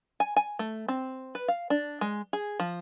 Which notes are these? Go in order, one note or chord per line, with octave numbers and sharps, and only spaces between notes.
G#5
G#5
A3
C4
B4
F5
D4
G#3
G#4
F3